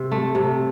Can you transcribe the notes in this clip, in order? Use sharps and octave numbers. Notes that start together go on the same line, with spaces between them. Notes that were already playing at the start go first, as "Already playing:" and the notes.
Already playing: C3
A3
C3